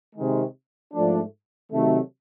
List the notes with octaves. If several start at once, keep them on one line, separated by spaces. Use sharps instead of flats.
C3 D#3 G#3
G#2 F3 A3 D4
C3 D#3 F#3 A3